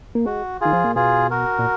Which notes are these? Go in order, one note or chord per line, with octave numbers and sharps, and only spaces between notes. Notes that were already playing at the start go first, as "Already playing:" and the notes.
A#3
G#3 F#4
D#3 F4 G#4
F3
A#2
B2 F4 G#4
F#4 A#4
A#2